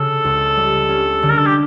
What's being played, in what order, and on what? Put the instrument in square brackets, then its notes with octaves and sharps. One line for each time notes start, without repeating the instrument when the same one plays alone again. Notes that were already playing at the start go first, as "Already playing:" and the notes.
Already playing: [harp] C#3 [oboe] A4
[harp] C#2
G3
C#4
D3
[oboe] A#4
A4
G4